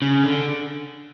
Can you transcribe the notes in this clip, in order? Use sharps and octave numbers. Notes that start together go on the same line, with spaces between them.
C#3
D3